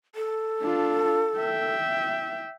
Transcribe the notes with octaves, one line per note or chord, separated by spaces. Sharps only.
A4
D4 F4
E5 G5